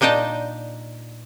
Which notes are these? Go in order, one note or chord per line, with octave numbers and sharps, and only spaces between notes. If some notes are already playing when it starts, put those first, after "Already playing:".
A#2 D4 D#4 G5 A5